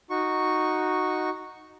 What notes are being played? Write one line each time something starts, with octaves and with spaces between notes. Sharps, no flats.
D#4 F#4 C#6